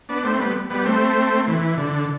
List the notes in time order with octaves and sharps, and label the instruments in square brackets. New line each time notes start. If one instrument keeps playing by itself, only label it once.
[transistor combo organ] B3 D4
A3 C4
G3 B3
G3 B3
A3 C4
E3
D3